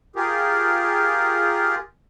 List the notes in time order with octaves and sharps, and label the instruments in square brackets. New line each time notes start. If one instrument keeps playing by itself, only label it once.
[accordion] F4 G4 G#4 A#4